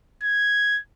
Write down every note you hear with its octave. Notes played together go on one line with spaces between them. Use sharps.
G#6